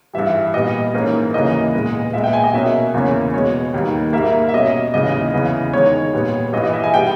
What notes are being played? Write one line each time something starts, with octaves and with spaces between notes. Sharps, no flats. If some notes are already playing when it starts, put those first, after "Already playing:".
G2 E3 G3 E5
A#2 G3 B3 D#5
G#2 E3 A#3 C#4
D#2 C#3 E3 A#3 C#4 D#5
A#2 G#3 B3
A#2 G#3 B3 E5
G5
G#5
D#5
B2 A#3 C#4 E5
E2 C#3 E3 A#3 C#4
B2 G#3 B3 C#5
D#2 D#3 G3 A#3
G#2 G3 A#3 E5
E5
B2 G3 C#4 D#5
D#2 C#3 E3 G#3 D#5
E2 C#3 E3
E2 D#3 G#3 C#5
A#2 G3 B3
G2 E3 G3 D#5
D#5
E5
G#5
B2 G3 B3 G5